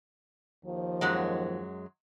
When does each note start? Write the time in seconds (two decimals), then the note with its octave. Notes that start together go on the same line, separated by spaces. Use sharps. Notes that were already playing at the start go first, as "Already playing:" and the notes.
0.64 D#2 D#3 F3
1.01 F#2 F#3 G#3